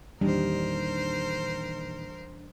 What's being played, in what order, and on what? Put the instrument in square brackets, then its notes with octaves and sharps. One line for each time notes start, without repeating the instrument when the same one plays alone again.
[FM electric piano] E2 E3 D4 [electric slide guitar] A#2 D#3 [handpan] G3 [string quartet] A#4 C5